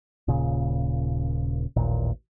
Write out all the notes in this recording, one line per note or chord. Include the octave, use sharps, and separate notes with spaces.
D#1 A#2 C#3
A1 D#2 A#2